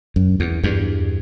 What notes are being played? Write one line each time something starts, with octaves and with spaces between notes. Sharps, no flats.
F#2
E2
E2 G2